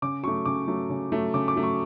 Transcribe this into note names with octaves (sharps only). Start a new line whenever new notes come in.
C#3 D6
F#3 A3 C#6
C#3 D6
F#3 A3
C#3
F#3 A3
C#3 D6
D6
F#3 A3
C#6